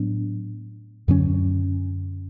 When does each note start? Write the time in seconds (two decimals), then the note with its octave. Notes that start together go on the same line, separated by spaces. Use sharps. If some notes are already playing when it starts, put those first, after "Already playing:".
Already playing: A2 F#3 B3 D4
1.08 F#2 D3 F#3 C#4